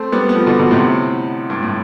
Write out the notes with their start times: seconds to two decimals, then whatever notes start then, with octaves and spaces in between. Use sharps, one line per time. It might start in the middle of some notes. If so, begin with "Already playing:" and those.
Already playing: A3 C4
0.12 G3 B3
0.29 B3
0.35 F3 A3
0.47 B2 D3
0.59 B2 D3
0.71 A2 C3
1.50 G2
1.62 A2